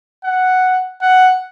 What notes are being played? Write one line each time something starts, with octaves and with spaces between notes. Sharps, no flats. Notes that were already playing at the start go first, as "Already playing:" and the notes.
F#5
F#5